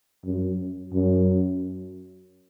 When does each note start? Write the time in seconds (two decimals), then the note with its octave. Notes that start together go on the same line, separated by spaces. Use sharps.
0.24 F#2
0.93 F#2